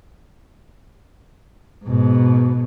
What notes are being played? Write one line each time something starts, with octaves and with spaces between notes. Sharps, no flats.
G#2 B2